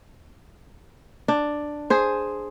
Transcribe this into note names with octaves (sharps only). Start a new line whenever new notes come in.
D4
G#4 C5